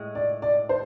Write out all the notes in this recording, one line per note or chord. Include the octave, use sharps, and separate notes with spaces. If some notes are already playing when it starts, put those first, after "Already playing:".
Already playing: A2 G#3
D5
D5
C5